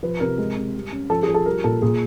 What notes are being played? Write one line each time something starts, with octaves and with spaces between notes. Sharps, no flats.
F3 B4
C3 A#4
G#3
C3
G3
C#4
F3 A4
G#4
F3
A4
G3 A#4
A#2 A4
A#2 G#4